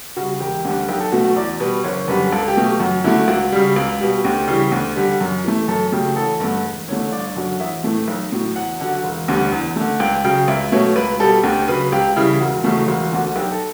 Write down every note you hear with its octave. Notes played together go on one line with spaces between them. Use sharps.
C#3 G3 F#4
E1 G4
D2 D3 G3
B1 G4
A4
B2 F#3 A3 F#4
F#4
E2 D5
B2 G3 B4
F#1 C#5
F#2 D3 G3 B4
C#2 A4
G4
B2 F#3 A3
G4
F#2 F#4
D3 F#3 A3 E4
C#2 F#4
C#3 G3
C#2
B2 G3
D2 G4
C#3 E3 G3
D2
D3 G3
F#2
E3 A3
F#2 A4
C#3 F#3 A3 G4
A1 A4
G2 D3 A3
E1
E2 D3 A3 C#5
G1 D5
F#2 D3 F#3
A1 E5
A2 E3 A3
B1
A2 F#3
E2 F#5
D3 F#3 F#5
E1
D2 D3 G3
E2
D3 A3
C#2 G5
C#3 F#3 G5
C#2 E5
B2 F#3 A3 C#5
C#2 B4
B2 G3 A4
D2 G4
C#3 F#3 B4
C#2 G4
C#3 E3 G3 E4
E1 F#4
E2 C#3 F#3 A3 F#4
E1 F#4
D2 D3 F#4
B1 G4
A4